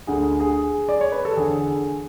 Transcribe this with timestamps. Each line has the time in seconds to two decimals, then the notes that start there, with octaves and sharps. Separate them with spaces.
0.07 D2 D3 G#4
0.40 G#4
0.89 D5
1.01 C#5
1.12 B4
1.25 A4
1.37 E2 D3 G#4